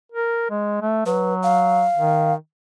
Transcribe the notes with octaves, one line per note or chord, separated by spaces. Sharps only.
A#4
G#3
A3
F#3 B4
F5
D#3